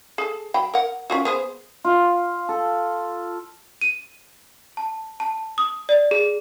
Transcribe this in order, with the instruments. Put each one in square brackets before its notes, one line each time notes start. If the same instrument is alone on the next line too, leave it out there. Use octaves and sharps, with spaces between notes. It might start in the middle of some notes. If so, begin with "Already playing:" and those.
[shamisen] G#4 A4
F#3 G5 B5
A#4 F#5
C#4 F4 F#4
B3 G#4 C5
[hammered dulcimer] F4
A4
[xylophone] D#7
A5
A5
D#6
D5
G#4